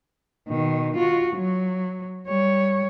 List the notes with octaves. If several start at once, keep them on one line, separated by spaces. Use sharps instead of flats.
B2 D#3
F4 F#4
F#3
G3 C#5